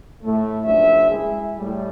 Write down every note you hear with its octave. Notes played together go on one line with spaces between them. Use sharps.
A2 A3
F#1 G2 F3 D4 E5
G#3 E4 G#4
A2 G3